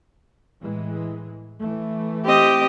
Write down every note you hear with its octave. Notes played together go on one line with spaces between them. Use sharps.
A2 E3 G#3
E3 A3
C4 G4 D#5